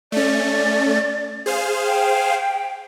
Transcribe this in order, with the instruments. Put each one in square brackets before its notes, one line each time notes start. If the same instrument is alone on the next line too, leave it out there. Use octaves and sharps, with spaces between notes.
[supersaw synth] A3 C#4 [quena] D5
[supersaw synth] G#4 C5 F5
[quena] G5